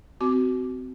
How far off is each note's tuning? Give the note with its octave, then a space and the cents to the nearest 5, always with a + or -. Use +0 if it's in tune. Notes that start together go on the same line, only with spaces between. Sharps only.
C4 -25 F#4 +20 D6 +0